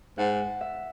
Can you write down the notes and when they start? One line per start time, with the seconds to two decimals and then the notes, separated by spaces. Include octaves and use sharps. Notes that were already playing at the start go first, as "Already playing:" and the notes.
0.18 G#2 F#5
0.61 E5